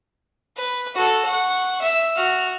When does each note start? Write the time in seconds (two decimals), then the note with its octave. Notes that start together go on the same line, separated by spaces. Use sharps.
0.56 B4
0.95 F#4 A4
1.25 F#5 C#6
1.81 E5
2.16 F#4 F6